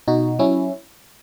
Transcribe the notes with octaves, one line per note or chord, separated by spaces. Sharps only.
B2 D#4 F#4
F#3 C#4 E4